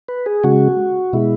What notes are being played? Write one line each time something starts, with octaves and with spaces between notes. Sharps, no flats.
B4
G#4
C#3 G#3 F#4
B2 G#3 E4